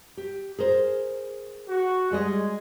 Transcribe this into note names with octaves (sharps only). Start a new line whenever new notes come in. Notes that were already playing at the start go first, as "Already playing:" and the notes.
G4
G#4 A#4 C5
F#4
G3 G#3 G#4 D5 D#5